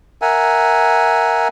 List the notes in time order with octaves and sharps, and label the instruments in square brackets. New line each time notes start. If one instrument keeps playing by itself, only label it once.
[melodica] A#4 E5 F#5 G#5